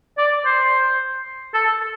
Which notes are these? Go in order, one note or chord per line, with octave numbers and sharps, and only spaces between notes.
D5
C5
A4